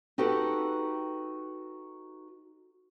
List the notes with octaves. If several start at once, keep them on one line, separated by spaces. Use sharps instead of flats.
D#4 F#4 G4 A4 B4